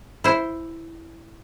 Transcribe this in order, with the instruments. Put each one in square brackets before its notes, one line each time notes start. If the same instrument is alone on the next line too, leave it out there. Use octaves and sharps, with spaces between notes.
[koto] E4 C5